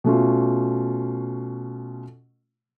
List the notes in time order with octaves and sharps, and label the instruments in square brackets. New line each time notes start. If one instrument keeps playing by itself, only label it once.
[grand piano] B2 A3 C#4 F4